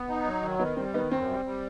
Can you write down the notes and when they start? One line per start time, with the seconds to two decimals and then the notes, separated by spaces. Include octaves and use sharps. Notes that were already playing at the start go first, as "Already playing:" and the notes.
Already playing: B3
0.08 D#4
0.25 F#3
0.42 D#3
0.59 D#3 B3 D#4
0.77 G3 C4
0.94 D#3 B3 D#4
1.11 F#2 C4
1.29 G3
1.45 G3